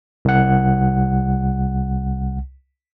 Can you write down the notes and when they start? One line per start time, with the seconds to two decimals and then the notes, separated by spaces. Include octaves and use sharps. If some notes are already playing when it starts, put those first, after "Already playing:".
0.25 C2 F#5